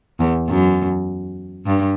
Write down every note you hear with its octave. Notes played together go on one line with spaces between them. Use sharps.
E2
F#2
G2